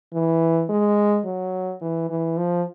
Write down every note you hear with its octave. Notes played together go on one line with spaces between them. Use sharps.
E3
G#3
F#3
E3
E3
F3